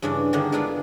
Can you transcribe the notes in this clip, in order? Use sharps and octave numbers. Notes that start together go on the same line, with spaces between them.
G2 C#3 E3 C#4 D4
D3 D#3 A#3 B3 D4
G#3 D4 E4 F4 G#4